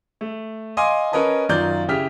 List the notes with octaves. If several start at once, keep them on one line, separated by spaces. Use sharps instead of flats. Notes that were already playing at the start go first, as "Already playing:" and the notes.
A3
D#5 F5 G#5 C6 D6
C#4 A#4 B4 D#5 G#5 A5
F#2 D#3 F4 D5 F5 G6
C#3 E4 G4 F6 B6